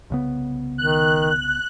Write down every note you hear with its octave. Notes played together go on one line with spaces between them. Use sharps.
C2 C#3 B3
D#3 F#6